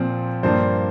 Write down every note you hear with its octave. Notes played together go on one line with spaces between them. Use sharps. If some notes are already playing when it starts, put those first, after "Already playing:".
Already playing: A#2 F3 C4
G2 F3 A#3 D4 C5